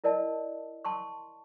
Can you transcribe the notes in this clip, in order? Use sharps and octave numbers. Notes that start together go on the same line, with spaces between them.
E4 A#4 D5 D#5 A5
A5 C6 C#6